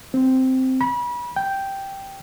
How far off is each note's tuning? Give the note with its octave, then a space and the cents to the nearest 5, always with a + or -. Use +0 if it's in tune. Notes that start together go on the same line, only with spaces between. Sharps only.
C4 -5
B5 -30
G5 +0